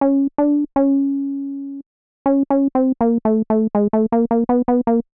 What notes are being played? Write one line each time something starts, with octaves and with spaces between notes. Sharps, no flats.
C#4
D4
C#4
C#4
C#4
C4
A#3
A3
A3
G#3
A3
A#3
A#3
B3
B3
A#3